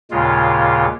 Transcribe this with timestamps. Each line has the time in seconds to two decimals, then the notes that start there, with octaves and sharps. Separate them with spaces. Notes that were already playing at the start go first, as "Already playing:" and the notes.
0.11 D#2 A#2 C#3 G#3 F4